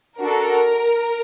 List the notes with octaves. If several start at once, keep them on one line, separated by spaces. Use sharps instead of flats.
D4 F#4 A4 A#4